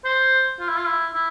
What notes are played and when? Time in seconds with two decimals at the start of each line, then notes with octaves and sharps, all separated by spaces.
0.05 C5
0.60 F4
0.69 E4
0.78 F4
0.87 E4
1.14 E4